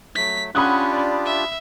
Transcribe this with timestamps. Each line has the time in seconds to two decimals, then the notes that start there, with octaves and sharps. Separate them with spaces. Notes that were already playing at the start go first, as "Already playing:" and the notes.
0.16 F#3 A3 B6
0.55 C#4 D4 F4 G4 F#5 B5 D#6 F#6
0.92 D5
1.26 E5